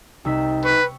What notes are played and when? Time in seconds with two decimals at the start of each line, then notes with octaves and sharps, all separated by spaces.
0.25 C2 D#4 E6 B6
0.64 B4 C#6